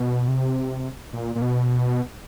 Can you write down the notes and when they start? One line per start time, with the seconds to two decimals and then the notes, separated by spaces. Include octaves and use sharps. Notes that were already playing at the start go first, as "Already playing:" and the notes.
Already playing: B2
0.28 C3
1.13 A#2
1.35 A#2
1.42 B2